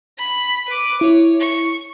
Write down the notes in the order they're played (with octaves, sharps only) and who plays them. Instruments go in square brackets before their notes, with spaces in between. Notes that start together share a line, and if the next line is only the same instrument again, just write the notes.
[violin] B5
B4 D6
[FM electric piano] E4 [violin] C#5
[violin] C#6